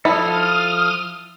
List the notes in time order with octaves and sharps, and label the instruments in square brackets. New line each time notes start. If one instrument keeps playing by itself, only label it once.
[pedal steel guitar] F3 A4 [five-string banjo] E4 [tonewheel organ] D#6 F6